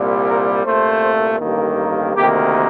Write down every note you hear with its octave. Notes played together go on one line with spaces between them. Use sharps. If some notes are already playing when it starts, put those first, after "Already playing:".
Already playing: C2 A#2 G3
A#4
C2 A#2 A3 C5
A1 G2 D#3 A#3
D2 C3 D#3 A#3 G4